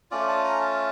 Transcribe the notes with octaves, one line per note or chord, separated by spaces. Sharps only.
A3 C#4 F4 D5
A5
A#5
A5